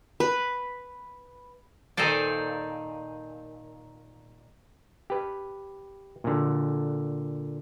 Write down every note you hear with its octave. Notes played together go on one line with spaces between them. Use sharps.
B4
A#2 D#3 D#4 A4 C5 D5
G4 B4
A#2 D3